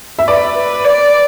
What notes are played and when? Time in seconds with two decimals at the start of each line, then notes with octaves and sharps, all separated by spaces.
0.19 E5
0.28 B4 D5
0.57 B4
0.85 D5